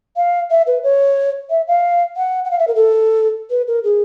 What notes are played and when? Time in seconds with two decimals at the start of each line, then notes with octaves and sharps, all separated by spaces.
0.17 F5
0.50 E5
0.67 B4
0.83 C#5
1.50 E5
1.68 F5
2.17 F#5
2.45 F#5
2.51 F5
2.59 E5
2.68 A#4
2.75 A4
3.50 B4
3.68 A#4
3.84 G#4